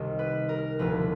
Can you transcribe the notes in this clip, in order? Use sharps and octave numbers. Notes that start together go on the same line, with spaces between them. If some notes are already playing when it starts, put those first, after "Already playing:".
Already playing: C2 C3 D#3
B4
A#4
E1 D2 D3 F3 B4